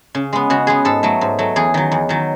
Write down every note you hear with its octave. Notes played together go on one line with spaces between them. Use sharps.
C#3
G#3 B3
C#3 F#4
G#3 B3 G#4
G#2 A4
F#3 A3
G#2
F#3 A3
E2 G#4
D#3 F#3
E2
D#3 F#3